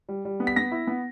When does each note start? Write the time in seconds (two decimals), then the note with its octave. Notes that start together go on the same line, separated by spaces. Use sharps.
0.09 G3
0.25 G3
0.40 B3
0.47 B6
0.56 B3 A#6
0.72 E4
0.87 B3